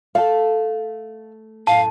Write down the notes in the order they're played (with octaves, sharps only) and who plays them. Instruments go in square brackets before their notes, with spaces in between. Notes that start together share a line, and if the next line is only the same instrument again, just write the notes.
[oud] A3 [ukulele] A4 F5
[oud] F#2 A2 [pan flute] F5 [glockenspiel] A5